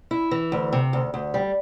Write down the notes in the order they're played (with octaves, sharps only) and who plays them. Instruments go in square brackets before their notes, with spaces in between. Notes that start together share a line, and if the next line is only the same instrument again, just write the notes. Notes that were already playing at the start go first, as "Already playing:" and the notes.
[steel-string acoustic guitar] E4
E3
D2
C3
D2
D2
G3